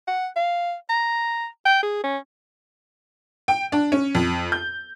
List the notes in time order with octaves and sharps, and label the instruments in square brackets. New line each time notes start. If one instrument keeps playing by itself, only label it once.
[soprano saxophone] F#5
F5
A#5
G5
G#4
C#4
[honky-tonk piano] G5
D4
C#4
F2
G6